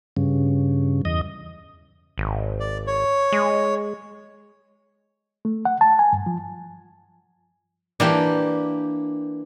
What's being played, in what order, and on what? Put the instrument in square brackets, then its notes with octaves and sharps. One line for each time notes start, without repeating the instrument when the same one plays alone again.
[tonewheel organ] G2 C#3
E2 D#5
[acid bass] G#1
[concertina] D5
C#5
[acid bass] G#3
[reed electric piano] A3
F#5
A5
G#5
G2
F3
[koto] E3 A#3 G4 [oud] D4